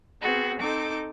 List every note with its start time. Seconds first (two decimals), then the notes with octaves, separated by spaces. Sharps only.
0.21 B3 C4 F#4 G#4
0.60 C4 D#4 A4 D6